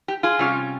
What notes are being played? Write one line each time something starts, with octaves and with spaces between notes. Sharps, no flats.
G4
F4 G#4
C3 G3 C#4 F4